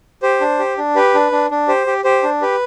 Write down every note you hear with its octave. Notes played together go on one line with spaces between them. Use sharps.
G4 C5
D4
G4
D4
G4 B4
D4
D4
D4
G4 C5
G4
G4 C5
D4
G4 B4